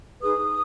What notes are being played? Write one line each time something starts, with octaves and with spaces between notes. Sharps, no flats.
D#4 G#4 B4 D#6